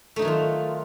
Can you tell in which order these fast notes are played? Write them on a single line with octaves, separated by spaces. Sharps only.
A3 D#4 F#3 D#3 F4